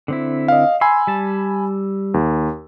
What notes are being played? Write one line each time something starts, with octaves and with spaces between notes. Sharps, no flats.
D3 C4 E4
D#5 F5
G#5 B5 C6 E6
G3 A5
D#2